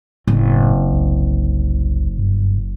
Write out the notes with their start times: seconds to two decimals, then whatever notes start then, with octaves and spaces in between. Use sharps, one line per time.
0.27 F#1 A2 C4
0.92 C2
2.18 G2